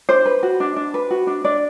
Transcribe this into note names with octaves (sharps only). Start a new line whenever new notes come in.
D4 C5
B4
F#4
D4
D4
B4
F#4
D4
D4 D5